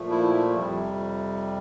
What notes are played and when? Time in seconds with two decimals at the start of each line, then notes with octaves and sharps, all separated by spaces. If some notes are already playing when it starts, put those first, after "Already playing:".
Already playing: A#2 F3 A3
0.10 E4
0.55 F2 C3 G3